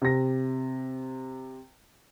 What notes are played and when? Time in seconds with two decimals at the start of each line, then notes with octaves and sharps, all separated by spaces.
0.02 C3 A#6